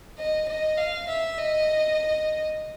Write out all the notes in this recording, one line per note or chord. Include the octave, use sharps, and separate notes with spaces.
D#5
D#5
F5
E5
D#5